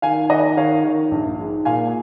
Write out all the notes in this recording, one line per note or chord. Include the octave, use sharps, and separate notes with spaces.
D#3 F5 G#5
D#3 D#5 F#5
D#3 C#5 F5
D#3
A#1
G#2
A#2 F5 G#5